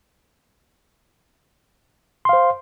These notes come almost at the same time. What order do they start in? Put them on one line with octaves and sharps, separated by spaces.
C6 F5 C5